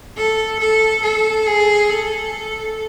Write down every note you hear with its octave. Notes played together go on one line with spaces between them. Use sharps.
A4
A4
A4
G#4
A4